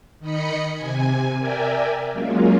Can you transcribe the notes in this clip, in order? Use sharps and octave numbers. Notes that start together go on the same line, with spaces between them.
D#3 D#5 B5 C#7
C3 G#5
A#4 D5 E5 G5 G#5
F#3 G#3 A#3 C#4 F4